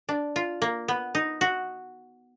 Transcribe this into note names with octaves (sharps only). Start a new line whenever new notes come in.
D4
F4
A#3
B3
D#4
F#4